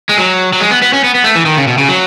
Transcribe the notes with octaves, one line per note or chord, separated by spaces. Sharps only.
G#3
F#3
F#3
G#3
B3
B3
C#4
B3
B3
A3
E3
D#3
C#3
B2
C#3
F#3